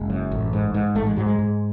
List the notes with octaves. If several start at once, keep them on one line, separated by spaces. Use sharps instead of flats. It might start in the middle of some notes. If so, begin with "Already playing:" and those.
Already playing: F#1 G#3
F#2
A1
G#2
G#2
A1 A3
G#3
G#2 F#3
G#3
G#2